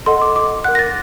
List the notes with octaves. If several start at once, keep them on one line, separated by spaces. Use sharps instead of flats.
A4 D#5 F#5 C6
D6
D6
A#4 F#5 F#6
A#6
A6